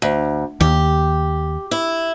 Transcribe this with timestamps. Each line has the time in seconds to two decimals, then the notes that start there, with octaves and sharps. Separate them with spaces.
0.02 D2
0.61 D#2 G4
1.71 E4